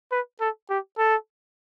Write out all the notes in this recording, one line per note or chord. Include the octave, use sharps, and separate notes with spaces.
B4
A4
G4
A4